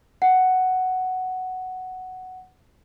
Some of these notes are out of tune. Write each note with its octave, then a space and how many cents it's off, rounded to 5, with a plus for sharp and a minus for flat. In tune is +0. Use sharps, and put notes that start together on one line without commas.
F#5 +5